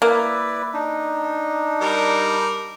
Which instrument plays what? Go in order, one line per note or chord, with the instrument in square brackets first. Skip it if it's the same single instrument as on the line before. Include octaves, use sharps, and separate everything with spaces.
[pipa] A#3 [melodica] E4 B4 D5
[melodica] D4 D#4
[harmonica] G3 A#4